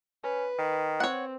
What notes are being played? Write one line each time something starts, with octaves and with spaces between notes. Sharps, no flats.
C#4 B4
D#3
C4 C#5 F#5